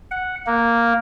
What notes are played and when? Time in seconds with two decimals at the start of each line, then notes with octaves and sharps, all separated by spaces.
0.11 F#5
0.47 A#3